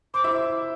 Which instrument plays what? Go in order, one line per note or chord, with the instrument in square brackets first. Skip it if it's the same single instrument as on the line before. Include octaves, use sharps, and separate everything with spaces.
[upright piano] C5 [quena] D6
[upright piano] E4 E5